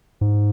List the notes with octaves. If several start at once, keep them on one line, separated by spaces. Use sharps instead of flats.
G#2